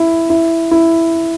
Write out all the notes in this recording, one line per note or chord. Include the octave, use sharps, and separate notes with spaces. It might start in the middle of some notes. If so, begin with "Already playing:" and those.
Already playing: E4
E4
E4